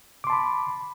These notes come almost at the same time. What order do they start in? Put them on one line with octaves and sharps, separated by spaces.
D6 C6 A5 B5